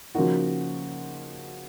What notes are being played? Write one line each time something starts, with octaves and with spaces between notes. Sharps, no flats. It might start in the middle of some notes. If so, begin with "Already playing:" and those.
C#3 F3 A#3 D#4 F#4